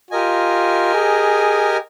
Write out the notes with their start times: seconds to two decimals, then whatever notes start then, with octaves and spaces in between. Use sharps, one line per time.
0.11 F4 G4 A#4 D#5 G#5
0.94 G#4